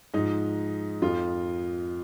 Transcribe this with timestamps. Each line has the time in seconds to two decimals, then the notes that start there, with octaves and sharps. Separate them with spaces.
0.14 G#2 F3 D#4
1.02 F2 F3 F4